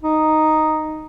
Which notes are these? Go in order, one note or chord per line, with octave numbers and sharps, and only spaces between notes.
D#4